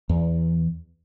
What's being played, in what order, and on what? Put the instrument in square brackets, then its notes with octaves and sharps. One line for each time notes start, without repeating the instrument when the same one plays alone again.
[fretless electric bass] E2